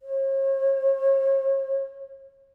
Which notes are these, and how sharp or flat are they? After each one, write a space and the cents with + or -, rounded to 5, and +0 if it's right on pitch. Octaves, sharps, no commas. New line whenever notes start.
C#5 -45